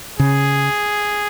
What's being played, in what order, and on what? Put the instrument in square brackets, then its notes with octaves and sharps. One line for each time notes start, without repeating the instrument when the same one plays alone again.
[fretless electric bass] C#3 [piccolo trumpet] G#4